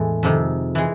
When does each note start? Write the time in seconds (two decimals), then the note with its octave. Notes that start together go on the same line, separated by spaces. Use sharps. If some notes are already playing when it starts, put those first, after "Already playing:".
Already playing: E2 A2 E3 G#3
0.23 F2 C3 D#3
0.75 E3 G#3